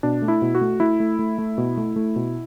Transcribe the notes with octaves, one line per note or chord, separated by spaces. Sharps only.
B2 D4
A3
E4
B2
F#4
A3
A3 E4
A3
A3
A3
B2
A3
A3
B2